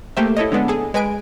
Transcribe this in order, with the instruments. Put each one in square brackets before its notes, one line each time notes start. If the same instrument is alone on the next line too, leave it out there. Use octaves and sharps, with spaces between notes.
[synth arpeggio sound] A3 A#3 G4 C5 E5
E4 A4 C#5 D#5
D3 G#3 B3 D4
G#4 A4
G#3 B4 G#5 D7